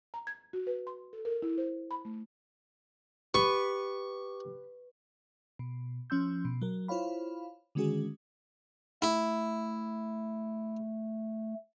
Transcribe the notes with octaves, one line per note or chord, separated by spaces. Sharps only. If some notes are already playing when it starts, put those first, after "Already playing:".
A#5
G#6
F#4
B4
C6
A4
A#4
E4
C5
B5
A3
G4 B4 C#6
B2
F3 C#4 C6 E6 G6
B2
F#3 A#4
E4 F4 C5 C#5 F5 B5
D3 D#3 G#3 C#4 F#4 G#4
A3 E4